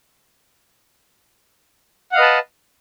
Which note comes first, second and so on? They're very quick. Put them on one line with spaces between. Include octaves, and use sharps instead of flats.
F#5 F5 D#5 B4 A5